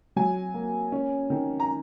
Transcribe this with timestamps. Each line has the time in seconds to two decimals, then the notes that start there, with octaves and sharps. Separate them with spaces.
0.16 F#3 G#5
0.54 A#3
0.92 C#4
1.30 D#3
1.60 A#5